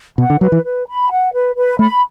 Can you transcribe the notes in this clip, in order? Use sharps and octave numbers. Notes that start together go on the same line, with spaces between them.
B2 F#5
D3
F#3 B4
E3
B4
B5
F#5
B4
B4
A3 B5